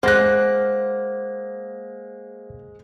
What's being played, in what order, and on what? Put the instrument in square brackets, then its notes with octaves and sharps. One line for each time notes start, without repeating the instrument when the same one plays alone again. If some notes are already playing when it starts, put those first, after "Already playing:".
[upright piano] G#3 A#6 [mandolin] A#3 F#6 [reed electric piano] C5 F#5